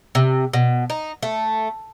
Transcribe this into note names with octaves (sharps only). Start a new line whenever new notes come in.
C3
B2
D#4
A3